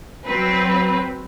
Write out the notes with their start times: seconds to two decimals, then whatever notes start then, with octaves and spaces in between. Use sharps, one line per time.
0.25 F#3 C4 B4